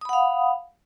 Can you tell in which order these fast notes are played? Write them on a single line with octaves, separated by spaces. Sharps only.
D#6 B5 F#5 F5